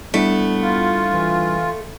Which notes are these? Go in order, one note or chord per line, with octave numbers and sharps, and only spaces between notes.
G3 A3 B3 D4 E4
F4
E3